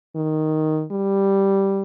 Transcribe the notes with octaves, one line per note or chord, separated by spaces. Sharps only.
D#3
G3